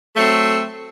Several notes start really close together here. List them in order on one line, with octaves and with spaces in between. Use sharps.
A3 F#3 C4